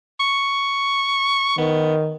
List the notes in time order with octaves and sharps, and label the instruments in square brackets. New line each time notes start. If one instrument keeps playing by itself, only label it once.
[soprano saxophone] C#6
[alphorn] D#3 [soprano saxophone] B3